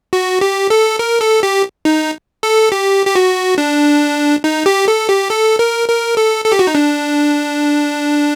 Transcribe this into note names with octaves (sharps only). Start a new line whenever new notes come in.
F#4
G4
A4
A#4
A4
G4
D#4
A4
G4
G4
F#4
D4
D#4
G4
A4
G4
A4
A#4
A#4
A4
A4
G4
F#4
D#4
D4